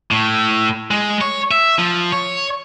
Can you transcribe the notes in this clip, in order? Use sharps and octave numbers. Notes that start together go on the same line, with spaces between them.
A2
G#3
C#5
E5
F3
C#5